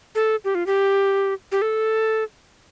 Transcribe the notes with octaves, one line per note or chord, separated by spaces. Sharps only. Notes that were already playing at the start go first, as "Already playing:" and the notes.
A4
G4
F4
G4
G4
A4